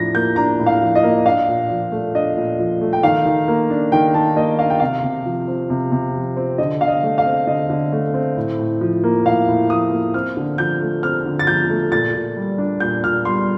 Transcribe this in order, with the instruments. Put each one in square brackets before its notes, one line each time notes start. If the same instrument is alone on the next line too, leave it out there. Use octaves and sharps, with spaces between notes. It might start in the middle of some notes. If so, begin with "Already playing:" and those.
Already playing: [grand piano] A2 F3 D4 A#6
A#3 G6
D4 A#5
A2
F5
F3
D#5
A#3
D4 F5
A#2
F3
A3
D4 D#5
A#2
F3
A3
G5
D#3 F5
D#3
A#3
D4
D#3 G5
D#3 A5
A#3 D#5
D4 F5
G5
C3 F5
C3
F3
C4
C3
C3
F3
C4
D3 D#5
D3 F5
D#5
A3
F5
C4
D3 D#5
D3
A3
C4
A2
A2
F3
A#3
A2 F5
A2
F3 D#6
A#3
C4 F6
D3
F3 G6
A3
C4 F6
D3
A6
F3 G6
A3
A#2 A6
A#2
G3
D4
A#2 G6
A#2 F6
G3 C6